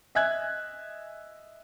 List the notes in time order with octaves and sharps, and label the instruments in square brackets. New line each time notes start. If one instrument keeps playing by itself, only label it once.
[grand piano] D#5 E5 G#5 F#6 G#6